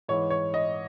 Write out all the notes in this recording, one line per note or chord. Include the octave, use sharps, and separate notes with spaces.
G#2 E3 C#5
C#5
D#5